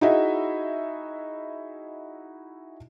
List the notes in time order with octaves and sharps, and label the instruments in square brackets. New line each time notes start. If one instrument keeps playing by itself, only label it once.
[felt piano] D#4 E4 F#4 G#4 D#5 E5